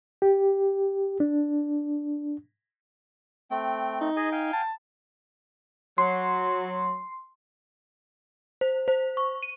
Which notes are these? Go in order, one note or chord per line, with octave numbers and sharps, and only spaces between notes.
G4
D4
A3 C4 G5
D#4
G#4 D#5 G#5
F5 G5 G#5
A5
F#3 C6
C5
C5
C#6
D#7